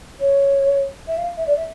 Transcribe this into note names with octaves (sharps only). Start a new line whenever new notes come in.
C#5
E5
F5
E5
D5
E5